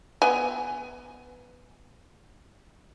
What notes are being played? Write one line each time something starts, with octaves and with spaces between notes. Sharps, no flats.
B3 G#5